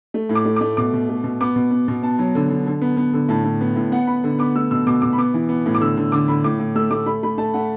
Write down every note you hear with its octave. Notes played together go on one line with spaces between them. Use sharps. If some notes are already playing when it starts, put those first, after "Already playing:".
A3
A2
D6
A3
A3 D6
B2 D6
B2
A3
B2
B3 D6
B2
B3
B2
B3 A5
F#3
D3
D3
D3
B3
B3
D3
A2 A5
A2
B3
A2
B3 F#5
B3 B5
D3
B3 D6
A3 E6
B2 E6
B2 D6
B2 D6
B5
B3 D6
E3
B3
A2
D6
D3 E6
D3
D3 D6
D3 B5
A2 D6
A2
A3 E6
A3 D6
A3 B5
A3 B5
A3 A5
A3 F#5